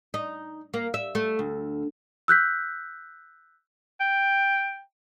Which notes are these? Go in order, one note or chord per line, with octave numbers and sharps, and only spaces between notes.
D#4
A#3
E5
A3
D2
E6 F#6 G6 B6
G5